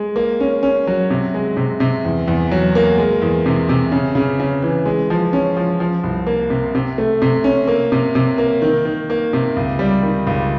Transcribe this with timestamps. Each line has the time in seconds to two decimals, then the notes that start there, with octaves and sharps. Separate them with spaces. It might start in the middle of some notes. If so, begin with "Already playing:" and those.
Already playing: G#3
0.16 A#3
0.40 C#4
0.63 C#4
0.87 F#3
1.10 C3
1.34 G#3
1.57 C3
1.80 C3
2.05 E2
2.28 E2
2.51 F#3
2.75 A#3
2.98 G#3
3.22 E2
3.46 C3
3.69 C3
3.92 C#3
4.15 C#3
4.40 C#3
4.62 E3
4.86 G#3
5.10 F3
5.33 C#4
5.57 F3
5.80 F3
6.03 C2
6.27 A#3
6.50 C3
6.75 C3
6.98 A3
7.22 C3
7.44 C#4
7.68 A#3
7.92 C3
8.15 C3
8.38 A#3
8.62 D#3
8.85 D#3
9.10 A#3
9.33 C3
9.56 C#2
9.79 G3
10.02 D#3
10.27 C#2